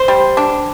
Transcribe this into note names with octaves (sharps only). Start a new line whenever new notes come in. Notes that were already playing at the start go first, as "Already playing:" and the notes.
Already playing: C5
G3
D4